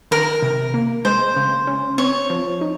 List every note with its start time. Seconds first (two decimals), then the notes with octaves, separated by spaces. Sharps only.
0.11 D#3 A#4
0.42 C3
0.74 A#3
1.05 G#3 C5
1.36 C#3
1.67 C#4
1.98 C4 C#5
2.30 F3
2.61 D#4